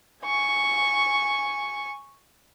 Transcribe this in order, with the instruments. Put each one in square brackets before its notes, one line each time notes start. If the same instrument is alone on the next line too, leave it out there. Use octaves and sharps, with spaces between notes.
[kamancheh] G#5 C#6